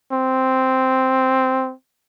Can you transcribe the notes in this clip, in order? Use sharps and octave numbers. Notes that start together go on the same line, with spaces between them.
C4